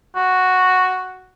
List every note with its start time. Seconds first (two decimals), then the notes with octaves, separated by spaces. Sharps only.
0.16 F#4